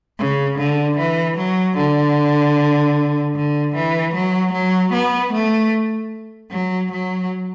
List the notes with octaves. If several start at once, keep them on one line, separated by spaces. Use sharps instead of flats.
C#3
D3
E3
F#3
D3
D3
E3
F#3
F#3
B3
A3
F#3
F#3